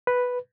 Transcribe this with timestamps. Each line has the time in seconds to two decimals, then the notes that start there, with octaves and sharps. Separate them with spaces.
0.07 B4